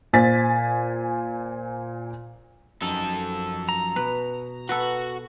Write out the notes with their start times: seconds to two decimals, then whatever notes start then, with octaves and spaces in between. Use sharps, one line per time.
0.13 A#2 C5 G#5 A6 B6
2.82 F#2 F3 D#4 A4 A5
3.69 A#5
3.96 B2 B4
4.69 F#4 A4 B4 F#5